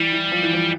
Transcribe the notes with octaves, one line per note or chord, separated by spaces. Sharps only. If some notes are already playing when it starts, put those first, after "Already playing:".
Already playing: E3 G3
E3
F3
E3
F3